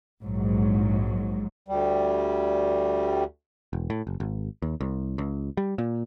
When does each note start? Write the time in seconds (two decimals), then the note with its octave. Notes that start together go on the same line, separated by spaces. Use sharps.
0.21 A#1 G#2 F#3
1.68 D2 G3
3.73 E1
3.90 A2
4.07 F#1
4.20 G#1
4.62 D#2
4.81 C2
5.18 C#2
5.57 G3
5.78 A#2